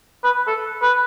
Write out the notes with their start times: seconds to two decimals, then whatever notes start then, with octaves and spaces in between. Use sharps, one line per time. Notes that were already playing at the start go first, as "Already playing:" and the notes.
0.24 B4
0.47 A4
0.82 B4